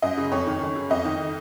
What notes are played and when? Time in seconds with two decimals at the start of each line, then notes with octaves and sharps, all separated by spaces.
0.02 F#2 D#5
0.17 C#3
0.32 F2 C#5
0.47 D#3
0.61 F#2
0.76 C#3
0.90 F2 D#5
1.05 D#3